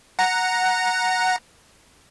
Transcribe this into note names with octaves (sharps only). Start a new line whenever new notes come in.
F#5 A#5